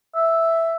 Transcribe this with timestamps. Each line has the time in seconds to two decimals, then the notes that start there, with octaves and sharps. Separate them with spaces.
0.15 E5